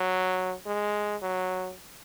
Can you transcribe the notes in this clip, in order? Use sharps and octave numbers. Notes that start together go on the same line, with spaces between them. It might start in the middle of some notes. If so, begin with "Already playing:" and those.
Already playing: F#3
G#3
F#3